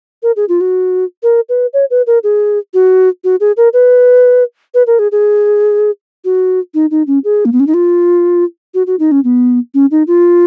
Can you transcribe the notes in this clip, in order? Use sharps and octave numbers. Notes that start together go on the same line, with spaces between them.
A#4
G#4
F4
F#4
A#4
B4
C#5
B4
A#4
G#4
F#4
F#4
G#4
A#4
B4
B4
A#4
G#4
G#4
F#4
D#4
D#4
C#4
G#4
A#3
B3
C#4
D#4
F4
F#4
F#4
D#4
C#4
B3
C#4
D#4
F4